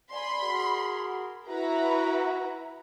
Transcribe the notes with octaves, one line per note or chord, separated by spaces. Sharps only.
D5 G#5 B5 C6
F#4 G#4 A#4
E4 F#4 B4 A#5